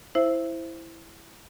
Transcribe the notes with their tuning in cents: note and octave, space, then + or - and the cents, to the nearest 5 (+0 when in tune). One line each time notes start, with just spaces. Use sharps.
E4 +0 C5 +0 E5 +25